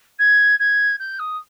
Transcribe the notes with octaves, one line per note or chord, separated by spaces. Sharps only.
G#6
G#6
G6
D#6